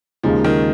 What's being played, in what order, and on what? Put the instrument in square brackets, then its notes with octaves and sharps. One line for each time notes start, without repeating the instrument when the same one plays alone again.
[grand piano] D#2 C#3 G#3 D#4 [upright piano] F3
[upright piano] D#3